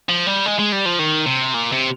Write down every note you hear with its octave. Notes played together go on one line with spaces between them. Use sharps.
F3
G3
G#3
G#3
G3
F3
D#3
C3
A#2
C3